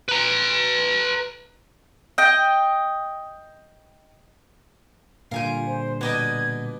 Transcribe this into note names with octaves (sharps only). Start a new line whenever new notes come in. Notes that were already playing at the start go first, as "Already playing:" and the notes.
B4 A#5
D#5 G5
A#2 D3 G3 F4 A#4 F5 G#5 G6
C5
B2 B3 D#4 D5 D#5 G5 G#6